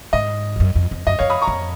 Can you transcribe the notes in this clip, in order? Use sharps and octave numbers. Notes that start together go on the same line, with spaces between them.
G#2 D#5
F2
F#2
F2
F2
F#2 D#5
F2 C#5 F5
B5 D#6
A#5 C#6
F2